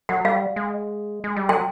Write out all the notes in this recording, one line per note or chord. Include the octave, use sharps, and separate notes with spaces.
F#3 F#5
G3 F5
G#3
G#3
G3
F#3 G5